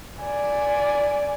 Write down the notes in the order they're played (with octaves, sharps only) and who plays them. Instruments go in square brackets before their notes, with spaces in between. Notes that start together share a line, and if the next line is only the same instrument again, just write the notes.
[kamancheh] D5 G#5